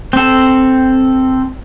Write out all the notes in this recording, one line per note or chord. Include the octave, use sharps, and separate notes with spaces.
C4 A4